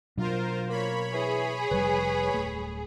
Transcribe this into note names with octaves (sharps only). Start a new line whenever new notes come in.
B2 F#3 D4 F4 A#4 C5
A#3 C#5 B5
E3 G#4
F1 G3 B4
D1 A3